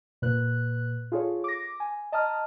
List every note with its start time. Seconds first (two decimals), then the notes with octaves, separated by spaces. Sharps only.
0.22 A#2 B4 F#6
1.12 F4 G#4 A4 C#5
1.44 D6 A#6
1.80 G#5
2.12 D#5 A5 A#5 D#6 F6